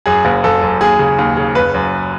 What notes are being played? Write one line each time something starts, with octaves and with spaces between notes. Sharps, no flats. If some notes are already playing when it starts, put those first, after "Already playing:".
F#2 G#4
F#1
F#1 A4
F#2
D#2 G#4
C#3
D#2
C#3
F#1 B4
F#2